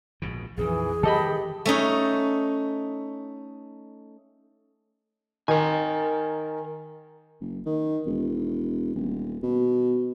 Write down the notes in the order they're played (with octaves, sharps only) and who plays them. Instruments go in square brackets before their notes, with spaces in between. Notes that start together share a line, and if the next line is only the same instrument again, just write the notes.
[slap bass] A#1 G#2 B2
[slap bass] A#1 F2 D#3 [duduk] E3 [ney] G#4
[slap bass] D#3 E3 G3 [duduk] G4 [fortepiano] A4 D#5 B5
[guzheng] A3 C#4 D#4
[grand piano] D#3 [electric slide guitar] A#4 G#5
[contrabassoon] F#1
D#3
E1
D#1
B2